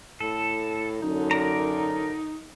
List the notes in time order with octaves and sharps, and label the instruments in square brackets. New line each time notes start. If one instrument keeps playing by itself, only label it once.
[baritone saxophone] A2 [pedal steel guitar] A4
[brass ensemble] F#2 D3 [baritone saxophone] D#4
[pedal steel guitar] A#4 D5 A#5